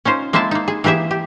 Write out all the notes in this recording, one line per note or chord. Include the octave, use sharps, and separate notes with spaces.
C#4 D#4 F4 C5
G#3 A#3 C4 E4 E5 A5
A#3 D#4
G#4
E3 A#3 G4 G#4 E5
G4